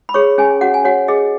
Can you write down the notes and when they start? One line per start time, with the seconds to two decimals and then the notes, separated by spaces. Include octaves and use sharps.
0.09 B5
0.14 G#4 C#5 C#6
0.38 C#4 G#4 G#5
0.61 C#4 F#4 F#5
0.74 G#5
0.84 F#4 C#5 F#5
1.08 G#4 D#5